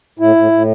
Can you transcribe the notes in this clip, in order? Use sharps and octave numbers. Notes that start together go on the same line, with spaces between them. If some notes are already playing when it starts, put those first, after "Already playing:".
A2 E4
A2
A2